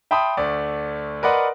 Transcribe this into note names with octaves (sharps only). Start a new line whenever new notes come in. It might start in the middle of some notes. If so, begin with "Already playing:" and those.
E5 G5 A5 B5 C6 D#6
D2 A3 D5
A#4 B4 D5 D#5 F#5 C6